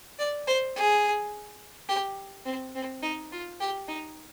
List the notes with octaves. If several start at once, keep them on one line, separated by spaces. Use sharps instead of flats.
D5
C5
G#4
G4
C4
C4
D#4
F4
G4
D#4